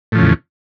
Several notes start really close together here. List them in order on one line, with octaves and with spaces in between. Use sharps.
A2 F3 C#3 E2